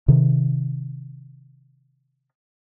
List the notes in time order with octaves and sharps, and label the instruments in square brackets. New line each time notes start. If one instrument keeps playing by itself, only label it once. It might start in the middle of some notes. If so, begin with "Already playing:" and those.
[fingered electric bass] C3 D#3